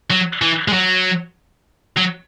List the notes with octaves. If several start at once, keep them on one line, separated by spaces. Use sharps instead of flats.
F#3
E3
G#3
F#3
F#3